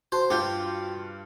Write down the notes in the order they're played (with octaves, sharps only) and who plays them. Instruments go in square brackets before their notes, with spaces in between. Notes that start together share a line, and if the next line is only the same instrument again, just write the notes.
[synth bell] F#4 A5 C6 [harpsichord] C5
[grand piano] G2 F4 G6 [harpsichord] G4